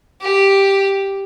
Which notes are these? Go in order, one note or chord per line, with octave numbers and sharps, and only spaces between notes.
G4